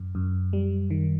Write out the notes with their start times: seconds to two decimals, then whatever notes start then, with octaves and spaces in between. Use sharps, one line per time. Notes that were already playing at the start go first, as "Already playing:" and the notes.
Already playing: F#2
0.15 F#2
0.53 G3
0.90 D#3